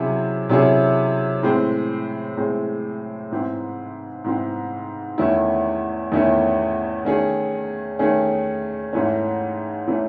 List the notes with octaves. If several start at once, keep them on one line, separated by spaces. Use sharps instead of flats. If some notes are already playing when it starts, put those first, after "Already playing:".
Already playing: C3 F#3 C#4 E4 G#4
C3 F#3 C#4 E4 G#4
A2 G#3 C4
A2 G#3 C4
G#2 E3 C4
G#2 E3 C4
E2 D#3 A3 C#4 E4
E2 D#3 A3 C#4 E4
D#3 A3 C#4 G#4
D#3 A3 C#4 G#4
G#2 E3 A3 C#4
E3 A3 C#4